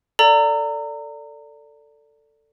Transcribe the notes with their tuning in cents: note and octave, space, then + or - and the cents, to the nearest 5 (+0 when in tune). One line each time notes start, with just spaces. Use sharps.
A4 +15 D5 -10 A#5 -25